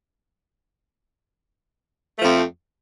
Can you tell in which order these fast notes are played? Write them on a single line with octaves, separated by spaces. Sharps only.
A3 F3 F2